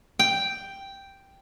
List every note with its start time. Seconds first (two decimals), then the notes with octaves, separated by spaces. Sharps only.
0.19 G5